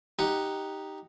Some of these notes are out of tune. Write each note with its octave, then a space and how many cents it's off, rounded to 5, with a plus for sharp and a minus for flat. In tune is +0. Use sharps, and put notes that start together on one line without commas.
D#4 +0 G4 +0 F#5 +0